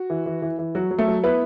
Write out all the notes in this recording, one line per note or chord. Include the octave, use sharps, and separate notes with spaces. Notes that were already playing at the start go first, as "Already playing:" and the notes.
Already playing: F#4
E3
E3
E3
E3
F#3 F#4
F#3
A3 A4
F#3
B3 E4 B4